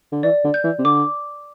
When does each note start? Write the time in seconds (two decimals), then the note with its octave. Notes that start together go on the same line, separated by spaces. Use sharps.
0.12 D3
0.23 E3 D5
0.44 D3
0.54 G6
0.64 E3
0.79 C3
0.85 D3 D6